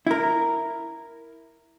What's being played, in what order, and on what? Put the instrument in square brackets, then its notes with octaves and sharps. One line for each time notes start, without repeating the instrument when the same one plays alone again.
[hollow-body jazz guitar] E4 A#4